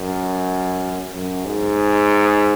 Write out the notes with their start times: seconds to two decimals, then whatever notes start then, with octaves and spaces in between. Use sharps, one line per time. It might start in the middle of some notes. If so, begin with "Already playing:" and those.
Already playing: F#2
1.14 F#2
1.45 G#2